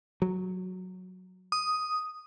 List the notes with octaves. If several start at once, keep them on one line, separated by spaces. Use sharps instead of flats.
F#3
D#6